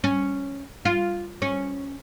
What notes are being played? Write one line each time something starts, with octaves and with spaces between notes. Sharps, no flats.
C#4
F4
C#4